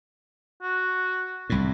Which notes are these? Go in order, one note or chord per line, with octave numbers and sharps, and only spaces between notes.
F#4
C2 A2